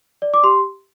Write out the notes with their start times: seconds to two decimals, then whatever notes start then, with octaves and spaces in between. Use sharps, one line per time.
0.22 D5
0.34 D6
0.43 G4 C6